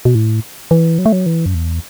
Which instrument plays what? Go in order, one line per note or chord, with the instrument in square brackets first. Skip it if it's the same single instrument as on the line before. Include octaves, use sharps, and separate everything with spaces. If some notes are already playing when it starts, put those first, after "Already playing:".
[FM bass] B2
A2
E3
F#3
A3
F#3
E3
F#2
E2